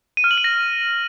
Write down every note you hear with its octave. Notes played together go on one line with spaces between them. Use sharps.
D#7
F6
F#7
D#7
A#6